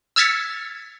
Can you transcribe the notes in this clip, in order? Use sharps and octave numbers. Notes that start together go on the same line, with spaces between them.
E6 F6 G#6 A6 B6 C#7